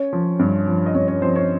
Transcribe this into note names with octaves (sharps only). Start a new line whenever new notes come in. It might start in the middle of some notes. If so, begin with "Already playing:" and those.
Already playing: C#4 C#5
F3
G2
F3
D#5
G2 C#4 C#5
C#4 C#5
F3 C4 C5
C#4 C#5